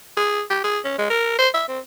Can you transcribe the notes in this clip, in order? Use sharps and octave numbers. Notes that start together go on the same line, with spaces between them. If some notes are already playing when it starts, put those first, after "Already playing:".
G#4
G4
G#4
C#4
G#3
A#4
C5
E5
C4